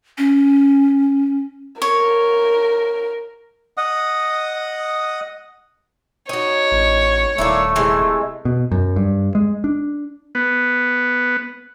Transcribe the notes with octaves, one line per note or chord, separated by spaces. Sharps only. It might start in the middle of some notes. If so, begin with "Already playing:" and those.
C#4
A#4 C#5
D#5 F#5 D#6
D#4 F#4 C#5
A1
D#1 A3 A#3 D4 E4
C3 E3 G#3
B2
F#2
G2
G#3
D4
B3